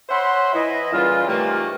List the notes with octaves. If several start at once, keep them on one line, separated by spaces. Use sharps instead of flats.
C5 C#5 E5 F#5 B5 C6
E3 E4 D#5
A#2 C#3 E3 G3 F4
C3 D#3 E3 A3 A#3 F4